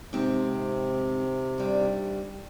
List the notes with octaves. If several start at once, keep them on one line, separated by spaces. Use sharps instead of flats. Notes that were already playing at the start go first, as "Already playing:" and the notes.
G#2 C3 C4 D#4
G2 G3